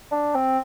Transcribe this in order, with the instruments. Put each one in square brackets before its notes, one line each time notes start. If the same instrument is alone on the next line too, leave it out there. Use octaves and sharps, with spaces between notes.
[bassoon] D4
C4